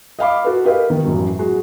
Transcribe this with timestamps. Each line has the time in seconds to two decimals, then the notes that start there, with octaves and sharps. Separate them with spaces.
0.19 D#5 F5 B5 D6
0.44 F#4 A4 B4
0.65 G4 A#4 B4 D#5 F5
0.90 D#3
1.04 A1 F#2 F#3
1.39 G#3 F#4